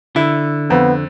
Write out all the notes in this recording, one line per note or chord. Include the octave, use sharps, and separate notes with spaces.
D3 E4
F2 B3